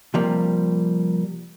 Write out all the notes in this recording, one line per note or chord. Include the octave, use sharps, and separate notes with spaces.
C3 F3 G3 A#3